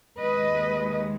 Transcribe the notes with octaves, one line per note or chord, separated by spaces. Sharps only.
D#2 D#3 G#3 B4 D#5